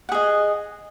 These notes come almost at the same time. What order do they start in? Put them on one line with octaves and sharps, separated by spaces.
F#5 G#4 D#5